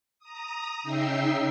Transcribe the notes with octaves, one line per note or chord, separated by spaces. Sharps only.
A#5 D#6
C#3 D#4 E5 G5 E6 C7